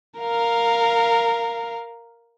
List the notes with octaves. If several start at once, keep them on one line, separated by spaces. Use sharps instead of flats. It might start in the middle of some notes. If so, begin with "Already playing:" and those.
A#4 F5